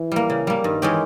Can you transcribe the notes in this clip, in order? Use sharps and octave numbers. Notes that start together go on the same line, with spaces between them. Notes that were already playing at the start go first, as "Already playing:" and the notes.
Already playing: E3
G3 A#3
C#3
G3 A#3
G2 D#3
E3 G#3 C#4 G4